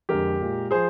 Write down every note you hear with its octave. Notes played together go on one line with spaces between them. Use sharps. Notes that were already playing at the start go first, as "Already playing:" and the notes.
F2 D3 G#3 G4 A#4
A#2 G#3
F3 G#4 C5